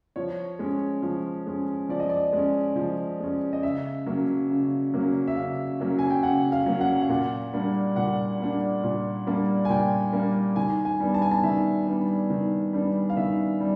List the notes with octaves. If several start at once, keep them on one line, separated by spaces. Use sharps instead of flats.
F3 C#5
G#3 C#4
F3
G#3 C#4
F3 D5
D#5
D5
G#3 C#4
F3
G#3 C#4
D#5
C#3 E5
F#3 A#3 C#4
C#3
F#3 A#3 C#4
E5
C#3 F5
F#3 A#3 C#4
G#5
G5
C#3 F#5
F5
F#3 A#3 C#4
F#5
F5
A#2 F#5
G3 A#3 D4
A#2 F#5
G3 A#3 D4
A#2
G3 A#3 D4
G#5
A#2 G5
G3 A#3 D4
D#3 G#5
G#5
G3 B3 D4
A5
G#5
A5
D#3 E5
G3 B3 D4
D#3
G3 B3 D4
F5
D#3 E5
G3